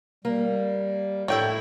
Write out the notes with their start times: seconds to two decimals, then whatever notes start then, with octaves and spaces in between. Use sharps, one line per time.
0.25 G3 A#3
1.28 A2 E4 C#5 G5